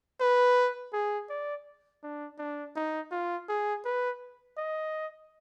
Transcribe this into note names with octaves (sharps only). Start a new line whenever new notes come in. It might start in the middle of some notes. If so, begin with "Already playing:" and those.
B4
G#4
D5
D4
D4
D#4
F4
G#4
B4
D#5